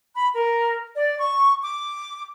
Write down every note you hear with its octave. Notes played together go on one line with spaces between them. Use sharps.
B5
A#4
D5
C#6
D6